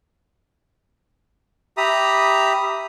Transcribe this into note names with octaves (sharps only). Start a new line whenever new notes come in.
G4 E5 A#5 B5 D#6